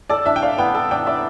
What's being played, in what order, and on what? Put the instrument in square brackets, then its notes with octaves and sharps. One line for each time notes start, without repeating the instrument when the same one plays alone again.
[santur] A4 [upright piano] D5
[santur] D4 [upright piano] E5
[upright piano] G5
[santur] D5 [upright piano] F5
[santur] B3 [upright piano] G5
[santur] A4 [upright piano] A5
[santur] D4 [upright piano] G5
[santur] D5 [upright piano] E5